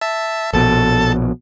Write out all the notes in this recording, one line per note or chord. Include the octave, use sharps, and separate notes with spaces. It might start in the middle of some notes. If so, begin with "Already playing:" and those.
E5 A5
A#1 B2 A4 A5 A6